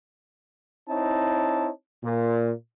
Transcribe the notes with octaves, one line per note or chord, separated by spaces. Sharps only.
C4 D#4 E4 C#5 A5
A#2